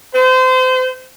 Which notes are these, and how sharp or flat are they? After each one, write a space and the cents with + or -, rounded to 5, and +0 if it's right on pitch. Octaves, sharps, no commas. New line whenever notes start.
C5 -30